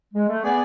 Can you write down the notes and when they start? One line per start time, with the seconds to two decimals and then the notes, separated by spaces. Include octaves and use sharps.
0.14 G#3
0.28 A3
0.43 B3 G#4 D5 G#5